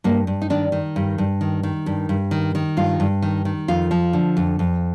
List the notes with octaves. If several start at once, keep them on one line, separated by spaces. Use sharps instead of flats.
G2 A#3
G2
D#4
D#3 D4
D#3
G2
G2
D#3
D#3
G2
G2
D#3
D#3
G2 F4
G2
D#3
D#3
F2 F4
F3
D3
F2
F2